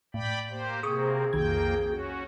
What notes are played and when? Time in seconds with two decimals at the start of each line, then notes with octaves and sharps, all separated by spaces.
0.14 A2 D5 G5 B5
0.50 A#3 G4 C5
0.83 C3 A#3 C4 G#4 C#6 D#6
1.33 B1 F2 D#3 A#3 G5 G#6
1.89 C#4 F#4